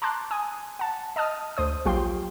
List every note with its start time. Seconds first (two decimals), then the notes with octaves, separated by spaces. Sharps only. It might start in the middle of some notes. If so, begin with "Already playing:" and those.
0.02 A5 A#5 C6 D6 F#6
0.31 G#5 D#6
0.79 F#5 A5
1.16 D#5 A5 D#6 F6
1.57 D2 C5 D#6
1.85 A#1 F#3 F4 G4 G5 C6